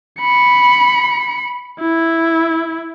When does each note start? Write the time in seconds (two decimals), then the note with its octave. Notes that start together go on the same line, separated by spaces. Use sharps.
0.21 B5 C#7
1.80 E4